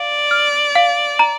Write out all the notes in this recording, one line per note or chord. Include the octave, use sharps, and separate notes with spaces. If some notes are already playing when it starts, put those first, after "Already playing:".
Already playing: D5 F5
F6
F5
A#5